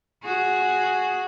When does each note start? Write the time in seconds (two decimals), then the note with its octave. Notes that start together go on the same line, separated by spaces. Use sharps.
0.24 F#4 G#4